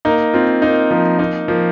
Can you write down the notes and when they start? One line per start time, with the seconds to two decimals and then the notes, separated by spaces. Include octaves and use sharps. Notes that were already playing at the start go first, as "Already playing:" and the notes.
0.05 A#3 D#4
0.33 C4 F4
0.62 A#3 D#4
0.91 F3 A#3
1.19 A#3 D#4
1.48 F3 A#3